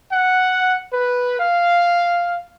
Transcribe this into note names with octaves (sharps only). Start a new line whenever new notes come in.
F#5
B4
F5